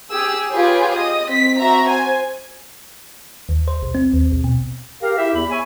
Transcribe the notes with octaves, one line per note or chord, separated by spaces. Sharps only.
G4 G#4 E6
F4 G4 G#4 B4 C#5
D#5 D#6
C4 B6
C4 F#4 E5 A#5
C5 G#5
D#2
C5
B1
C4
D#2
B1
B2
G4 A#4 F5
E4 G4 E5
E2 B5
C#5 E5 G#5